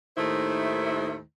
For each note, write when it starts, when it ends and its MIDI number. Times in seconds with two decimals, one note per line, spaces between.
0.18 1.19 39
0.18 1.19 45
0.18 1.19 51
0.18 1.19 57
0.18 1.19 64
0.18 1.19 72